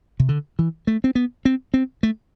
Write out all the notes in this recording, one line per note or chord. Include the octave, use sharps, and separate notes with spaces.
C3
D3
E3
A3
C4
B3
C4
C4
A3